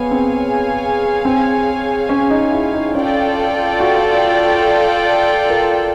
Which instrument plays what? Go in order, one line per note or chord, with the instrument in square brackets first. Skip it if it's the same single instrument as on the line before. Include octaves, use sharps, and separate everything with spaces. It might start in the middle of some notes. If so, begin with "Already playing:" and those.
Already playing: [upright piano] B3 [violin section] G#4 C#5 F5 G#5
[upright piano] C4
C4
C#4
D#4
E4
D#4
[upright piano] C#4 [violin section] F4 A4 D5 G5
[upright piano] F#4
A#4